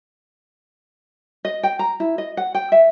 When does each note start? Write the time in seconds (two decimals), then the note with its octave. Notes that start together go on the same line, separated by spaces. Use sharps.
1.45 D#5
1.63 G5
1.79 A#5
2.00 E4
2.18 D#5
2.37 F#5
2.55 G5
2.72 E5